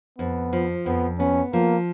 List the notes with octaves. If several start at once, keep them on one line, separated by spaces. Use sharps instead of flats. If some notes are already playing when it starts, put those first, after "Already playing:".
F2 B3
F3
F2 B3
B3 C#4
F3 A#3